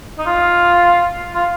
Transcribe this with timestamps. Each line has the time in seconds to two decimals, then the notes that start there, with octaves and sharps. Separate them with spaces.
0.18 D#4
0.26 F4
1.35 F4